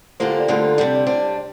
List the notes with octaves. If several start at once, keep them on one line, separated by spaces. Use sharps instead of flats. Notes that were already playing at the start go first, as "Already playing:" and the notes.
D3 F3 A#3 D4 G4 C5
C5
D5
D2 D3 G3 A#3 F4
C3 G3 D4 D5
D5
G3 D4 C5